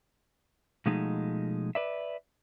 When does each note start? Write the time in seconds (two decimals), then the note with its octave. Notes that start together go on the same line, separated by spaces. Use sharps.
0.86 B2 F3 G#3 A3 D#4
1.75 B4 D5 E5